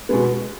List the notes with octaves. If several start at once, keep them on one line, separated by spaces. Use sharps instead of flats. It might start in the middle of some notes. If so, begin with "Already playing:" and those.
B2 G#3 B3